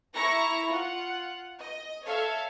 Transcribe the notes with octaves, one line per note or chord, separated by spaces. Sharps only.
E4 A#5 C#6 A#6 C#7
F4 F#5
D#5
A4 C#5 E5 F5